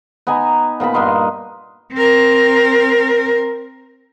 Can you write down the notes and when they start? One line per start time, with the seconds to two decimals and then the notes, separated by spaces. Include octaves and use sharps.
0.27 B3 D#4 G#5 A#5
0.80 A#2 B3 A5 B5
0.94 G2 A#4 D#5 C6
1.93 C4 A#4